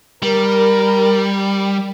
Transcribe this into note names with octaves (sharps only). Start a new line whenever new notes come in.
G3 A#4